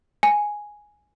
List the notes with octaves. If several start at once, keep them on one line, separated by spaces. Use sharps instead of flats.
G#5